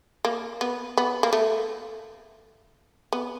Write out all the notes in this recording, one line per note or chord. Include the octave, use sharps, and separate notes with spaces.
A#3
B3
B3
A#3
A3
B3